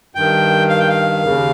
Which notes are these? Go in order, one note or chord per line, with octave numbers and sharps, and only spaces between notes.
G2 D#3 G5
F5
G5
F5
D#2 C#3